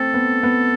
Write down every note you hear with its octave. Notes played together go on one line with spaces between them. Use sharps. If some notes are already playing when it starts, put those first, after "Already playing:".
Already playing: A3 C4 A4
B3
B3